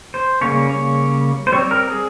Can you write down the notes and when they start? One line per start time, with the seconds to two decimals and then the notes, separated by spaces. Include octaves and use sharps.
0.14 C5
0.41 C#3 G3 A#3 C#4 C#5
0.69 C#5
1.47 C5
1.52 G3 C4 C#5
1.71 A#4
1.90 G#4